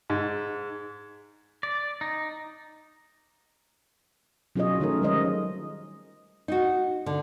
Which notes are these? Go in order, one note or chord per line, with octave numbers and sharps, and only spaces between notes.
G#2
D5
D#4
F#3 C#4 F4 G#4 C#5 D#5
D#3 A3 C#4 D#4 A4 A#4
G3 G#3 C#4 C5 D#5
D#4 F#4
D3